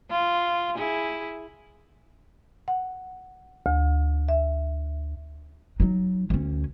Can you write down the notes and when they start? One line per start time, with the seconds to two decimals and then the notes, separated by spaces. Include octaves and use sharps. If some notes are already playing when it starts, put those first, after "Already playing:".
0.11 F4
0.76 E4 G#4
2.68 F#5
3.66 D2
4.29 E5
5.80 F#3 D#4
6.30 D2 C#4